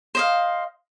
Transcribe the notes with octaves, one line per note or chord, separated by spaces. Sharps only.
C5 D#5 F5